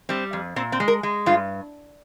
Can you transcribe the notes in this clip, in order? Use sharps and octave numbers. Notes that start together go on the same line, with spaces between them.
G3 C4
F2
A#2 C4
C4
G#3
A#4
G#3
G2 F4